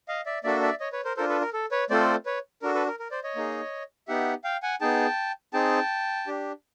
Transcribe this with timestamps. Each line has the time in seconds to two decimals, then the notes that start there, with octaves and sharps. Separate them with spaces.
0.08 D#5 F5
0.26 D5 E5
0.44 A#3 D4 F#4 A4 D5 E5
0.62 D5 E5
0.80 C#5 D#5
0.92 B4 C#5
1.05 A#4 C5
1.17 D4 F4 A4 A#4 C5
1.29 A4 B4
1.41 A#4
1.53 A4
1.71 B4 C#5
1.90 A3 C4 F4 A4 C5 D5
2.26 B4 C#5
2.62 D4 F#4 A4 A#4
2.74 A4 B4
2.87 A#4
2.99 A#4
3.11 C5 D5
3.24 C#5 D#5
3.36 A#3 D#4 G#4
4.08 B3 D#4 G4 E5 F#5
4.44 F5 G5
4.63 F#5 G#5
4.81 B3 D#4 G#4 G5 A5
5.53 C4 D#4 G#4 G5 A5
6.27 D4 G4